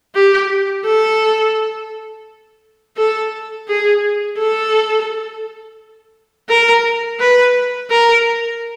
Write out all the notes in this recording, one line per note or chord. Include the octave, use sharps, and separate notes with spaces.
G4
A4
A4
G#4
A4
A#4
B4
A#4